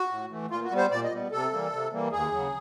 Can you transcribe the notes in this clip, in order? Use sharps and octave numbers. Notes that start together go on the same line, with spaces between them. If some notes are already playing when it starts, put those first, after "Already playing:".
Already playing: F#4
A2
E3 A3
A#2 F4
F#4
G3 B3
C5
A#2 D5
D#5
G3 B3
C3 A4
E3 G3 A#3
C3
E3 G3 A#3
D#2 G#4
C#3 F#3